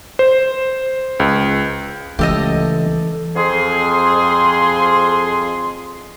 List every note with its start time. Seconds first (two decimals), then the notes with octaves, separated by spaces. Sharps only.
0.19 C5
1.20 C#2
2.19 C#2 E3 A3 G4 A4 D#5 F5
3.36 F2 G#4 C6